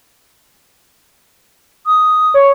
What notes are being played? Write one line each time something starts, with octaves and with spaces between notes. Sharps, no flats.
D#6
C#5